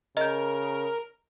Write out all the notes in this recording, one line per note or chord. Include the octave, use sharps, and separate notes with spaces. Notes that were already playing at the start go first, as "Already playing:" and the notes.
C#3 A#4 D#5 G6